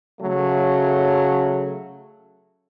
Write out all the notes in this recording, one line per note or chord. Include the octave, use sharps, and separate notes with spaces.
C#3 F#3 A3